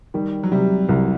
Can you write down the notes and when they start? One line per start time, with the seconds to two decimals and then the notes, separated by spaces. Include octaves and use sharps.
0.14 D#3 G3
0.43 F#3
0.52 C3 G3
0.89 C2 F#3